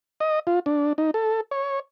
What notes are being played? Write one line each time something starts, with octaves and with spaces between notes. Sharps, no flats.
D#5
F4
D4
D#4
A4
C#5